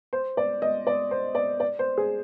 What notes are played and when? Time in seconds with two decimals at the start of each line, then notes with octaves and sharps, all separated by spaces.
0.13 C5
0.37 D5
0.62 D#5
0.87 D5
1.11 C5
1.35 D5
1.60 D5
1.79 C5
1.98 G#4